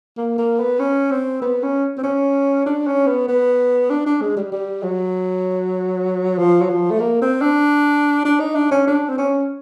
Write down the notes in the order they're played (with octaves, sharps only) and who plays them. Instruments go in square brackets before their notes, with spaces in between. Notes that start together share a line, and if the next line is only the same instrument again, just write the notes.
[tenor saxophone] A#3
A#3
B3
C#4
C4
B3
C#4
C4
C#4
D4
C#4
B3
B3
D4
D4
G#3
G3
G3
F#3
F3
F#3
F3
A3
A#3
C4
D4
D4
D#4
D4
C#4
D4
C4
C#4